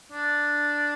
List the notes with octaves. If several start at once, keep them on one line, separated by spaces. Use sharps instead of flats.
D4